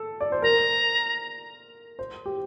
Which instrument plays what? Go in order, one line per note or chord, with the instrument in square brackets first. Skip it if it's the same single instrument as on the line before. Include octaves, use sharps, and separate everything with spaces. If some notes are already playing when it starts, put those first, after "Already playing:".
Already playing: [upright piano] A4
D5
C5
[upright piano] A#4 [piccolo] A#5
[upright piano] C5
G4